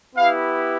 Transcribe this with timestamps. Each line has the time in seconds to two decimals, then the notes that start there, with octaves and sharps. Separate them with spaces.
0.16 B3 E4 G4 F5